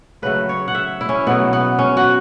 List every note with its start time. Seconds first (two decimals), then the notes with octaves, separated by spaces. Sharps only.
0.22 C#3 F#3 A3 B4
0.49 C#5
0.68 F#5
0.75 E5
1.01 E4
1.09 C#4
1.27 B2 F#3 A3 B3
1.53 B3
1.79 C#4
1.97 F#4